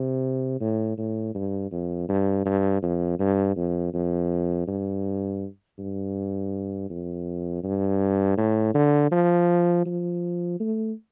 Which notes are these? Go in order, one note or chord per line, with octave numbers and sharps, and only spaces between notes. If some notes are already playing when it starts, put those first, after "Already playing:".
Already playing: C3
A2
A2
G2
F2
G2
G2
F2
G2
F2
F2
G2
G2
F2
G2
A2
D3
F3
F3
A3